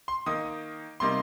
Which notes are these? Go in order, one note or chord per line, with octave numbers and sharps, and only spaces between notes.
C6
D#3 A#3 D#4 D#6
C3 G3 A#3 D#4 C6